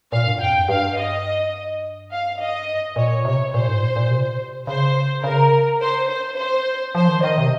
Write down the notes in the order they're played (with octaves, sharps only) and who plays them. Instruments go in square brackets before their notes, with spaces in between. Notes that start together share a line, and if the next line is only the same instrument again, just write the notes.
[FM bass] A#2 [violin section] F5
[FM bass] G2
[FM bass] F2 [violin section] G5
[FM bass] G2
[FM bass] G2 [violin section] F5
[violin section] D#5
F5
D#5
[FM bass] A#2 [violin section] C#5
[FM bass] C3 [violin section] C#5
[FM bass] A#2 [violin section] C5
[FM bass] G#2
A#2
A#2
C3
[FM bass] C#3 [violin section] C5
[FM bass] C#3 [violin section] A#4
[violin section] C5
C5
C5
[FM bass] F3 [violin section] C5
[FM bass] D#3
[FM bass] D#3 [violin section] D#5
[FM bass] C3